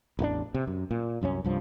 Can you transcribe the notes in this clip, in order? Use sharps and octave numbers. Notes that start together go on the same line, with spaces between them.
A1 E2 A3 D4
C3
F#2
A#2
C2 F#2 F3 C#4
C2 G2 F3